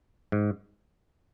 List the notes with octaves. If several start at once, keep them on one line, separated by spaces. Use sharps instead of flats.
G#2